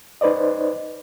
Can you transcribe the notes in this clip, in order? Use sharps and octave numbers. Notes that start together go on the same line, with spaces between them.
D#4 B4 C5 D5 D#5